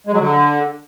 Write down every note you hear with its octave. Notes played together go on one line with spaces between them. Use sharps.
G#3
F#3
D3